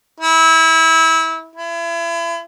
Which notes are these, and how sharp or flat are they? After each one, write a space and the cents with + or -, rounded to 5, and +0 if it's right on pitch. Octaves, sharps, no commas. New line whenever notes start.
E4 -25
E4 +35